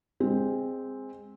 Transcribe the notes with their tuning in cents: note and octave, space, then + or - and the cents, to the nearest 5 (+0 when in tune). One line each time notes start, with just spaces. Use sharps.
G#3 -15 C4 +0